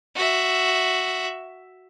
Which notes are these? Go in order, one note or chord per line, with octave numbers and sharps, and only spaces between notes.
F#4 E5